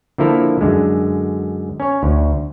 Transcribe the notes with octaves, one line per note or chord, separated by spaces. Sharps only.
D3 F3 A#3 E4 A4 A#4
F#2 D3 G#3
C#4 C#5
D2